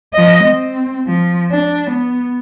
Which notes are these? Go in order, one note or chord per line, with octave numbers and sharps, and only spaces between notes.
F3 D#5
C4
F3
D4
B3